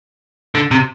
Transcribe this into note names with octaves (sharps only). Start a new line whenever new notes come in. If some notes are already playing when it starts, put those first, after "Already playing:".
D3
C3